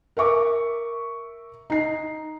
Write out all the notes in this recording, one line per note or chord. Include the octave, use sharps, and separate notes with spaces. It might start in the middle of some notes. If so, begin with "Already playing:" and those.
A#4 E5 C#6 D6
D#4 C7